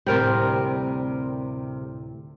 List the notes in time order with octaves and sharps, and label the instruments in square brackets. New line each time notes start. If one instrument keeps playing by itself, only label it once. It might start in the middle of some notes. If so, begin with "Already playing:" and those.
[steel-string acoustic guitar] D2 A2 [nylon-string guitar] C3 G3 [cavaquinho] A#4 G5